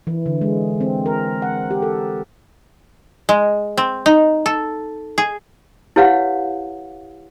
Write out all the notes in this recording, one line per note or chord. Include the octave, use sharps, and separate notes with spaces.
E3
D3
G#3
C4
A#4
F#5
G4
A4
G#3
C4
D#4
A4
G#4
E4 G4 B4 C#5 F5 F#5